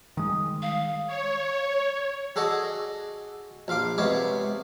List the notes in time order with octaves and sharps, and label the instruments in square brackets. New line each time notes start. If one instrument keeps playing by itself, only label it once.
[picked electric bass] D#3 G#3 [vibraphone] G3 D#6
[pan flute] F5
[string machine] C#5
[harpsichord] F#4 G#4 A4 D5 D#5
A#1 F4 F5 D6
C3 G#3 B3 C#5 D5 D6